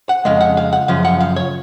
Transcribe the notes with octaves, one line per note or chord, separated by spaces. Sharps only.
F#5
F2 C#3 G#3 F5
F#5
F5
F#5
F#2 C#3 F3 F5
F#5
F5
C#5